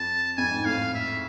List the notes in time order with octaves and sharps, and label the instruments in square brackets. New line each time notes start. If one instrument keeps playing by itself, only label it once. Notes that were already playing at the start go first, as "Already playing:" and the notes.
Already playing: [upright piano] F2 [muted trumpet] A5
[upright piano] F2 [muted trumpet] G#5
[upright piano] G#2
[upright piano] A2 [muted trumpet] F5
[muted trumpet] E5